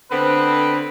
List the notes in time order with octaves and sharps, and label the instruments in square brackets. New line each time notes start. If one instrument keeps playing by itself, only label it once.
[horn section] D3 B3 C4 [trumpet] B4